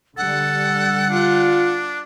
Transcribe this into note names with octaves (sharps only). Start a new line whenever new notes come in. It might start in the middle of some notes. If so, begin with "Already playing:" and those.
D3 G3 A4 F#5
D4 F4